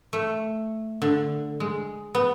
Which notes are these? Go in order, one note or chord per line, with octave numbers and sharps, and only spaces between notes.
A3
D3
G#3
B3